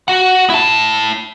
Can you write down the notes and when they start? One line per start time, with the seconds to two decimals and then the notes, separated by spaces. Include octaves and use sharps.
0.08 F#4 F#5
0.50 E4 A5